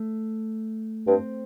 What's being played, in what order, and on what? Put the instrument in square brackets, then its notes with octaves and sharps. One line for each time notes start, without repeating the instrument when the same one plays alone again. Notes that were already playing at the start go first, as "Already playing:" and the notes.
Already playing: [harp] A3
[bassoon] G2 [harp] C4